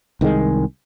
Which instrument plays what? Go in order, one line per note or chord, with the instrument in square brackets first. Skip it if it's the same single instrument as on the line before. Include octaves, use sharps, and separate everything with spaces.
[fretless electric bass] C2 D#3 G3 G#3